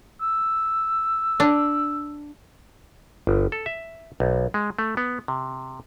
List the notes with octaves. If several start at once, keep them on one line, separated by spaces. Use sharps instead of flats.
E6
D4
G1
A4
E5
B1
G#3
A3
B3
C3